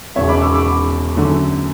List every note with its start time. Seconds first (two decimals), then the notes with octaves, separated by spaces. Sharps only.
0.16 E1 E2 C#3 C#5 E5
0.29 B5 D6
0.41 C#6 E6
0.54 B5 D6
1.16 F#2 D3 A3